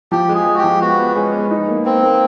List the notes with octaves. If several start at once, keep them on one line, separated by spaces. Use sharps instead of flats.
F3 G4
G#3
G#4
G#3
F#4
G4
F3
B3 F#4
B3
G#3 C#4
B3
D#4
A#3
A#3 C4
A#3